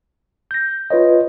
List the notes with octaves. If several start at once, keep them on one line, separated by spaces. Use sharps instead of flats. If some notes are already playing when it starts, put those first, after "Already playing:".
G6 A#6
F4 B4 C#5 D#5